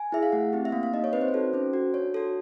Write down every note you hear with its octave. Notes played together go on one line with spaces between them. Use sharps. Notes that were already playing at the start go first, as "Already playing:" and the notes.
Already playing: G#5
E4 G#4 E5
F5
A3 F#5
C4 E4 G4
E5
A#3 F5
F5
D#4 G4 D#5
C#5
C4 B4
C5
B4
D#4 F#4 A4
C#4 C5
F#4 A4
D4 C#5
F#4 A4